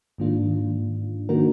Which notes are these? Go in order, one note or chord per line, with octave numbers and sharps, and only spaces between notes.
G#2 D#3 A#3 D4 F4
D#3 A#3 D4 F#4 A#4